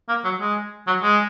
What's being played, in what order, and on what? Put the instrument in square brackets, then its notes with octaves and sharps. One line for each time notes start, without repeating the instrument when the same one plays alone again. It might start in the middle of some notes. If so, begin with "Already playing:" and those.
[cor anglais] A#3
F#3
G#3
F#3
G#3